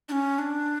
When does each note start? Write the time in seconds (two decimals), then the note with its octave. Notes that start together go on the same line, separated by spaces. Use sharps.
0.09 D4
0.12 C#4
0.38 D4